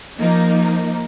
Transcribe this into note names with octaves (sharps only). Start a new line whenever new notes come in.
F3 A#3 D#4